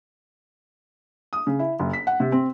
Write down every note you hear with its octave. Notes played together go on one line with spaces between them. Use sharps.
D#6
C#3
E4
F#1
B6
F#5
C3
C4